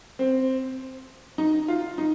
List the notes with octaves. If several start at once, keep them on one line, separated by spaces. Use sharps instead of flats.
C4
D#4
F4
D#4